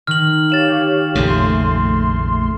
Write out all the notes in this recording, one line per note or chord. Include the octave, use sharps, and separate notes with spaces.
D#3 F6 F#7
G4 C#5 F5 A6 E7 F#7
A#1 F2 C#3 A3 C6